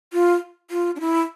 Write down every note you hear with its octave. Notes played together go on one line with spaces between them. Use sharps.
F4
F4
D4
E4